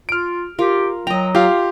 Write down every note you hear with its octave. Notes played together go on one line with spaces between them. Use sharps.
F4 F6 D7
F4 G4 A#4
F#3 D#5 G5 A#5
F4 G4 F5